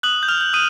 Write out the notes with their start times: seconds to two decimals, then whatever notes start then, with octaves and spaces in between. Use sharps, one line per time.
0.03 D#6 F#6 F#7
0.23 G6
0.28 F6 F7
0.41 G6
0.54 D#6 D#7